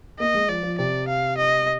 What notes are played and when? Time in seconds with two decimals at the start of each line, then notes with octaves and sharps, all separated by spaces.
0.19 A#3 D#5
0.35 G#3
0.49 F3 D5
0.63 F3
0.78 C3 D5
1.08 F5
1.37 D#5